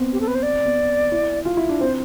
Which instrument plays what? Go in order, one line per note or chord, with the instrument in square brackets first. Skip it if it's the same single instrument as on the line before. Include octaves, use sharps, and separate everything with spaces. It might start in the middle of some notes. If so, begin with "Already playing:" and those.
Already playing: [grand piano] B3 C4
[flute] G4
A4
B4
C5
D5
[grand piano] B3
C4
E4
F4
E4
D4
[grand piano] C4 [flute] C5